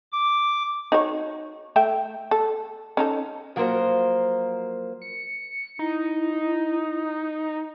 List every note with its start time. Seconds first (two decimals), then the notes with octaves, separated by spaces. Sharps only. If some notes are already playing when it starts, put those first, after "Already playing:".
0.12 D6
0.92 D#4 F#4 C#5
1.76 A3 E5 G5
2.31 A4
2.97 C#4 D#4 A4
3.56 F3 F#3 A#3 A#4 C5
5.02 C#7
5.79 D#4 E4